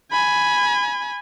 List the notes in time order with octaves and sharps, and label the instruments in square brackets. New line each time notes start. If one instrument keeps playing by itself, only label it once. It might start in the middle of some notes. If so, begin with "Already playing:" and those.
[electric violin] G#5 B5